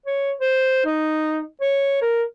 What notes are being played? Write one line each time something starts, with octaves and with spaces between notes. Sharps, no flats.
C#5
C5
D#4
C#5
A#4